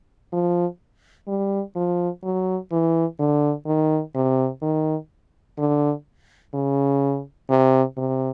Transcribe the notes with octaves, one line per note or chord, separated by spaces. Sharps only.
F3
G3
F3
F#3
E3
D3
D#3
C3
D#3
D3
C#3
C3
C3